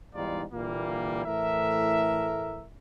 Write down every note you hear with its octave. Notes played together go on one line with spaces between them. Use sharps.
E2 G#2 G3 D#4 F4 D5
A#2 D3 E3 G3 A#3
A2 E3 A3 A#4 E5